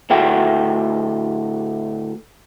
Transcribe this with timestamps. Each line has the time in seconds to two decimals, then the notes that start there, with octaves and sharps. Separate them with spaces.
0.10 D2 A2 A3 F#4 C5 G5